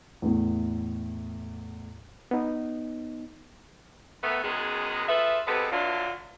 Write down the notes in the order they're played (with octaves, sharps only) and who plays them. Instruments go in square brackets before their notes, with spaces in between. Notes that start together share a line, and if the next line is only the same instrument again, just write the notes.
[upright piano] E2 A2
[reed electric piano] B3 D#4
[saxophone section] D#3 A3 B3
F#2 D#3 G#3 B3 G#4
F4 G#4 A4 B4 E5
C3 G#3 B3 A4 B4
D3 E3 F#3 D4 F4